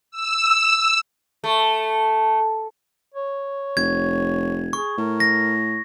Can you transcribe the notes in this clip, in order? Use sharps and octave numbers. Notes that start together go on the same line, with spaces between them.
E6
A3
C#5
F1 G#6
G#4 C#6
A2 A#4
A#6